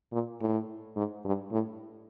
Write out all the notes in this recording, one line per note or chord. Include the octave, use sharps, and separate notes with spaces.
A#2
A2
G#2
G2
A2